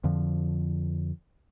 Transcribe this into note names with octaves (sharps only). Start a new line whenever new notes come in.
F2 D3 F3